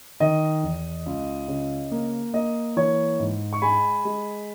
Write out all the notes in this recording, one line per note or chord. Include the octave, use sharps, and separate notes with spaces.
D#3 D#5
E2
C#2
C#3
A#3
A#3 D#5
E3 C#5
G#2
C#6
G#3 G#5 B5
G#3